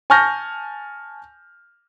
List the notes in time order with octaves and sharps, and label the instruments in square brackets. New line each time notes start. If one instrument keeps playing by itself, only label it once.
[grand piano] G#5 A5 C#6 F6 G6 A#6